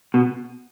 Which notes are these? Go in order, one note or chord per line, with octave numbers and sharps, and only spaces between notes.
B2